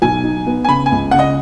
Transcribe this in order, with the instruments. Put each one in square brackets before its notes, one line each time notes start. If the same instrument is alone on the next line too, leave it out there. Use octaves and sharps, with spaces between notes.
[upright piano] B1 [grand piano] G#5
[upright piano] D#4
B3
[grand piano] G#5
[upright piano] C#3 [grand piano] B5
[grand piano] G#5
[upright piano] C#2
[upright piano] C#3 [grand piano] F#5
[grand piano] D#5